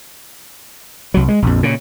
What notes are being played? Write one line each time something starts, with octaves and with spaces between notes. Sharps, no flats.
C2 F#3
G#3
A#1 F2
A#2 C#3